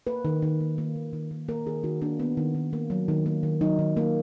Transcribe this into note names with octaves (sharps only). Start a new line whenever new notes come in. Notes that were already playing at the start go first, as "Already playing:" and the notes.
A#3 B4
D#3
D#3
A#3
A#3
D#3
D#3
A#3
A#3 A#4
D#3 G#4
D#3 F#4
A#3 D4
A#3 B3
D#3
D#3
A#3
F#3
D#3
A#3
D#3
F#3 D#4
D#3
A#3